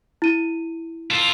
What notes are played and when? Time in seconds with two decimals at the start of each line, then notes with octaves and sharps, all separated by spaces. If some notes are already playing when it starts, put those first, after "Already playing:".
0.22 E4 D#7
1.11 F4 A4